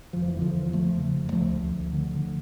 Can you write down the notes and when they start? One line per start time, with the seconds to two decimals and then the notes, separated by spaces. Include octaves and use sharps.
0.13 F1 F3
0.28 E3
0.33 E2
0.41 D3 F3
0.53 E2
0.73 E2 F3 A3
0.93 C#3
1.13 F1
1.32 D2 F3 A3
1.52 D2
1.72 D2
1.92 D3
2.11 D3